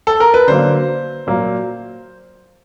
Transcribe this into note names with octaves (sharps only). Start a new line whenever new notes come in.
A4
A#4
B4
D3 F#3 A#3 C5
A#2 F#3 A#3